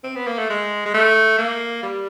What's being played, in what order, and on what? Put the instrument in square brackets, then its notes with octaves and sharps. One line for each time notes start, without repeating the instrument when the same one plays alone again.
[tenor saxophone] C4
B3
A#3
A3
G#3
G#3
A3
A#3
G3